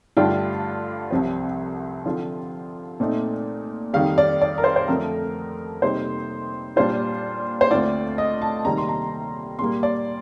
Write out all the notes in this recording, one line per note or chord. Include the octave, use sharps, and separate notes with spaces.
G2 D3 A3 D4 F4 G5
C2 C3 F3 C4
D3 F3 C4 F4
A#2 A3 C4 D#4
F2 D#3 G3 F5
D5
D5
A#4
C5
C5
F2 D3 F3 A3 A#4
F2 C3 G3 A#3 D#4 C5
A#2 G3 D4 F4 C5
C5
D2 D3 A3 C4 F4 D5
D#5
A5
C3 D#3 G3 A#3 A#5
C6
A#5
A#2 G3 A#3 C6
D5